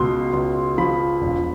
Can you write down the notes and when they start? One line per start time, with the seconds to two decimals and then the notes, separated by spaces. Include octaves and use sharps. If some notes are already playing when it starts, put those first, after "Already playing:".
Already playing: C#2 B2 C6
0.33 C#2
0.78 F3 B5
1.21 E1